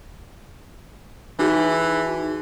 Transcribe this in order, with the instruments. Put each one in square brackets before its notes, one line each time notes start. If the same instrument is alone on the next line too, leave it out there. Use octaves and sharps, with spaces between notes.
[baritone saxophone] E3 [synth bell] D#4 F#4 G#4